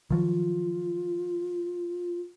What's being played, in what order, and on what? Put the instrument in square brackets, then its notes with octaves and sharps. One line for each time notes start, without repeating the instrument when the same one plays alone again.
[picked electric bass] D#3 F3 F#3 [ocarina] F4